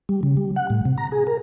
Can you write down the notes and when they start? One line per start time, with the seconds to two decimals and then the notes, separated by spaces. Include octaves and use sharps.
0.09 G3
0.23 C#3
0.37 G3
0.56 F#5
0.70 A2
0.85 C3
0.98 A#5
1.12 G#4
1.27 A#4